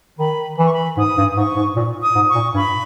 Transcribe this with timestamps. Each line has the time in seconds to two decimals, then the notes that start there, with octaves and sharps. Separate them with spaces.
0.19 D#3 B5
0.58 E3 B5
0.65 C#6
0.72 B5
0.97 G#2 D#6
1.18 G2
1.37 G#2 C#6
1.56 G#2
1.76 A#2
2.02 D#6
2.15 G#2
2.29 C#6
2.35 A#2
2.54 G2 B5